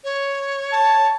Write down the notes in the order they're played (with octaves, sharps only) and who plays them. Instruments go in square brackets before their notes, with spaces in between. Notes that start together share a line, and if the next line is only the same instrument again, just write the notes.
[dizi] C#5
[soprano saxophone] A5